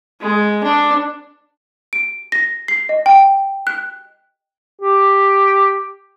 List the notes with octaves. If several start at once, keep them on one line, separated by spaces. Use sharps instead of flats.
G#3
D4
D7
A#6
C7
D#5
G5
F#6
G4